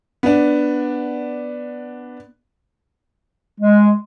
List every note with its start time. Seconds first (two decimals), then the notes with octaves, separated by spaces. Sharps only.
0.23 B3 D4
3.59 G#3